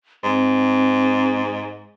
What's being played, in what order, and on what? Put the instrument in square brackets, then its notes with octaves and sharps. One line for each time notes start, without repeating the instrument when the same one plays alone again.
[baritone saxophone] G#2 [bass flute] C4